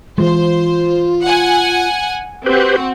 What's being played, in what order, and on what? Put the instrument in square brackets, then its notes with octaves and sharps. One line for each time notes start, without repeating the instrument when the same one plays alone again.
[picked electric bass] E3 G#3 [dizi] F4 [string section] C5
[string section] F#5 G#5
[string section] C4 F#4 [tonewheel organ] G4 B4 C5